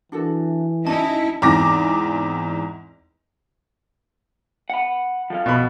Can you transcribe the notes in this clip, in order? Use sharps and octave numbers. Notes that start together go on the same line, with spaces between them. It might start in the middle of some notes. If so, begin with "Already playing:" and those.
E3 D4 F#4 A4
C#4 D#4 E4 F#4 D5 A5
E2 G#2 C4 D6 A#6
F#5 B5
F3 A4 F5
B2 B5